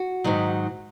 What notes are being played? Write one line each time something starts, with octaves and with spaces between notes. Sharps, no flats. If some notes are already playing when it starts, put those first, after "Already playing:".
Already playing: F#4
G#2 D#3 F#3